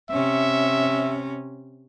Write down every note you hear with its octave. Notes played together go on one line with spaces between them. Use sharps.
C3 C#4 E5